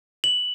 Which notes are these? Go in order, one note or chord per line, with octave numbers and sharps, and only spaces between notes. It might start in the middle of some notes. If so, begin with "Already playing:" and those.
F#7